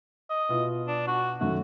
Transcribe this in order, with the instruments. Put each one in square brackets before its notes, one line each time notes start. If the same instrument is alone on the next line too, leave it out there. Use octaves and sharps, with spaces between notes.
[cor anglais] D#5
[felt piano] B2 E4 F4
[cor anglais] D4
F#4
[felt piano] F#2 D#3 A3 [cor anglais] F#4